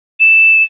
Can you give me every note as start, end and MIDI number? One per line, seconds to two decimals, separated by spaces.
0.20 0.63 100